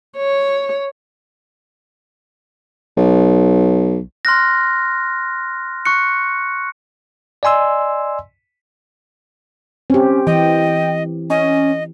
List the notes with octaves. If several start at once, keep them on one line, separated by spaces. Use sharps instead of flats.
C#5
B1
C6 F6 F#6 A#6
C#6 F#6 C#7
D5 D#5 G#5 C6 E6
C4 C#4 G4
E3 D#5 G5
C#4 D#5